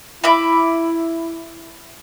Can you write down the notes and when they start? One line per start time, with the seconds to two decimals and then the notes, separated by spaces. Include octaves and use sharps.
0.24 E4 E5 B5 D6